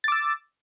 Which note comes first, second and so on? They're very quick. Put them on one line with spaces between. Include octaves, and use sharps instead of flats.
A6 D6 E6